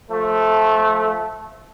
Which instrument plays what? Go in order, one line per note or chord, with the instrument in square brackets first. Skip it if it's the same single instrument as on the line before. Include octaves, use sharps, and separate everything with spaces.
[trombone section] F3 A3